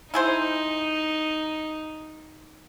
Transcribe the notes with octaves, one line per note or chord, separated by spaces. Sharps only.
D#4 E4 G#4 C5